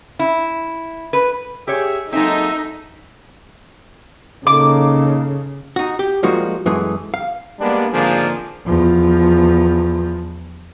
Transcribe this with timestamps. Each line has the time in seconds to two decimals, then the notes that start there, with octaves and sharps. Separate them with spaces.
0.19 E4
1.13 B4
1.67 G4 G#4 C#5 E5
2.12 F#3 G#3 A#3 C4 D#4 A4 E5
4.47 C#3 A#3 D#4 A4 D6
5.76 D#4 F#4
5.99 G4
6.23 F3 G3 G#3 A#3 D#4 F#4
6.66 F#2 E3 G#3 A3 G#4
7.14 F5
7.59 G3 G#3 A#3 B3 D4
7.92 G#1 D3 F3 A#3 D4 G#4
8.66 E2 F3